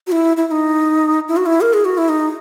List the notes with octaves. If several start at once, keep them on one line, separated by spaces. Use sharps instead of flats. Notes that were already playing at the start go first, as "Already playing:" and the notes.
F#4
E4
E4
E4
D#4
E4
F#4
E4
A#4
G#4
F#4
E4
D#4